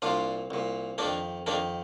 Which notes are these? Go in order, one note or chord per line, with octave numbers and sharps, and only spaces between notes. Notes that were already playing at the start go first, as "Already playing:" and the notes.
C2 A#2 D4 F4
C2 A#2
F2 D#3 A#3 D4
F2 D#3 A#3 D4